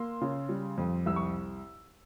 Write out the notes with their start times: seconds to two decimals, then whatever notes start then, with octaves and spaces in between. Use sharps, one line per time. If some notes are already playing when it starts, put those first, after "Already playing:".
Already playing: A#3 C6 E6
0.21 C#3
0.49 G3
0.78 F2
1.06 C2 E6
1.16 C#6